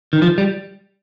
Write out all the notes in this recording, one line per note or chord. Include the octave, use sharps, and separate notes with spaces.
D#3
F3
G3